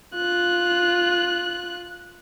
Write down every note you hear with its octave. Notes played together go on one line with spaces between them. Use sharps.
F4 F#6